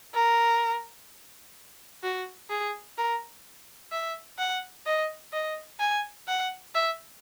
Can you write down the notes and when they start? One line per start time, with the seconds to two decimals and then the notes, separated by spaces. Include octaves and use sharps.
0.14 A#4
2.03 F#4
2.50 G#4
2.98 A#4
3.92 E5
4.38 F#5
4.86 D#5
5.33 D#5
5.80 G#5
6.28 F#5
6.75 E5